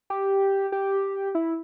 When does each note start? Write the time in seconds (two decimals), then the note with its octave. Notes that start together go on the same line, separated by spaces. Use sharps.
0.10 G4
0.72 G4
1.35 E4